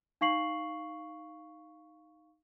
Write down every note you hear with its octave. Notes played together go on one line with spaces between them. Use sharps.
D#4 F5 C#6 C7 F#7